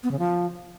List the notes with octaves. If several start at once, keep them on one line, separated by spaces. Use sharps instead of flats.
B3
C#3
F3